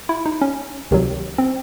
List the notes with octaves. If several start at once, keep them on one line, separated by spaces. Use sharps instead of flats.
E4
D#4
C#4
C#2 C3 D#3 F#3
C4